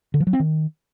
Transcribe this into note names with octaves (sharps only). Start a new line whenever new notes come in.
D3
F3
F#3
C4
D#3